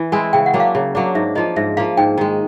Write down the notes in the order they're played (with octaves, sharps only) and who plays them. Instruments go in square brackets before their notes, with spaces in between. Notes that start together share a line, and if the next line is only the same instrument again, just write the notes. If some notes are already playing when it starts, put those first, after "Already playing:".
Already playing: [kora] E3
[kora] G#3 C4 E4 [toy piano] G#5
[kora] C#3 [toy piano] G5
[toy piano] F#5
[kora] F#3 A#3 D4
[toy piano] F5
[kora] C#3
F#3 A#3 D4
[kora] G#2 [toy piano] E5
[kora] F3 A#3 [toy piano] D#5
[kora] G#2 [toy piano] E5
[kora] F3 A#3 [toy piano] F5
[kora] G#2 [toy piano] G5
[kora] D#3 G#3